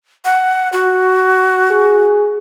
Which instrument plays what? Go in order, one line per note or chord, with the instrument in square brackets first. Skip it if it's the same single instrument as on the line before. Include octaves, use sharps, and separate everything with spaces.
[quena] F#5
F#4
[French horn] G#4